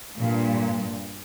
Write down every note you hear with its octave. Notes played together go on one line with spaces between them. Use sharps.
G2 A#2